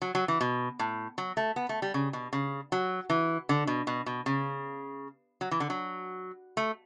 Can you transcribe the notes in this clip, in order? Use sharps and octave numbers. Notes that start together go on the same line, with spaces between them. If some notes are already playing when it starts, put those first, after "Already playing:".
F#3
F#3
E3
B2
A2
F#3
A3
B3
A3
G3
C#3
B2
C#3
F#3
E3
D3
B2
B2
B2
C#3
F#3
E3
D3
F#3
A3